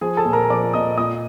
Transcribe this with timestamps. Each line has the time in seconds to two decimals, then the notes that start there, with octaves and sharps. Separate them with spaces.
0.01 F3 G#4 G#5
0.17 A4 A5
0.25 A#2
0.33 A#4 A#5
0.49 F3 D5 D6
0.74 A#2 D#5 D#6
0.97 A#2 D#5 D#6